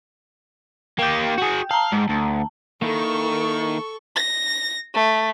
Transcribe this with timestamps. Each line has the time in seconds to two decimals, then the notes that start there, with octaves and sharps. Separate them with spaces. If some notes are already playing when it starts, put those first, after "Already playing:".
0.99 A#3 G4 G5 G6
1.38 F#4 G#4
1.71 F5 A5 A#5
1.92 G#2
2.09 D2
2.82 D#3 A#3 E4 A4 C#6
4.16 A#6
4.94 A3